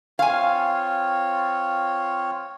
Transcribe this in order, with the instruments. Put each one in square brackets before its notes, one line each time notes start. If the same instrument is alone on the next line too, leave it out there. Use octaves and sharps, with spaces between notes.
[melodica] C4 F4 C#5 [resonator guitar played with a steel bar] F5 G#5